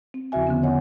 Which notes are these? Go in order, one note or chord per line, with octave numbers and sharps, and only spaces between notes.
C4
E2 C#3 F3 F#4 E5 G#5
D3 B3 C#4
C#5 D#5 F#5 G#5